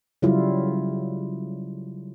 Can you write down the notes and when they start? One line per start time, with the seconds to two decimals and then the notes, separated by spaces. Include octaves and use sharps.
0.22 C#3 F#3 G3 E4 F4